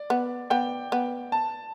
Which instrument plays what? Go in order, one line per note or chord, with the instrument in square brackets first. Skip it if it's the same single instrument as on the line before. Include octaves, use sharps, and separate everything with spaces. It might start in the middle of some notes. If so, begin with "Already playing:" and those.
Already playing: [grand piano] D5
[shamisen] B3
[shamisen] B3 [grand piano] G5
[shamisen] B3
[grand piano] A5